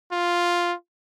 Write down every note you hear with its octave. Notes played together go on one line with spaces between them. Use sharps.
F4